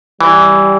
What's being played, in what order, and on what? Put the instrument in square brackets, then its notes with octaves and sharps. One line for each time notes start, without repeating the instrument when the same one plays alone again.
[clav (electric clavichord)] E3 [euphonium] G3